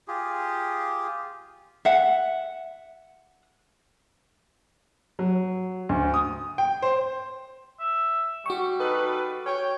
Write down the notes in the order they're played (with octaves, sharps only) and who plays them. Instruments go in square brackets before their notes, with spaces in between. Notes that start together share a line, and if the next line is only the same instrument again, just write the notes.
[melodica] F4 G4 G#4
[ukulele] E5 F#5
[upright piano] F#3
D2
D#6
G5
C5
[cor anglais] E5
[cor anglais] G3 [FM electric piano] F#4 C#6
[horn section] D#4 A4 B4
C#5 G5